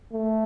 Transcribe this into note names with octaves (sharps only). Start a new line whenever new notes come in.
A3